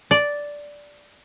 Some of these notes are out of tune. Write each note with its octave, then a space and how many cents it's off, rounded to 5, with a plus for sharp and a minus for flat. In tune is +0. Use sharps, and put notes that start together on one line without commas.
D5 -5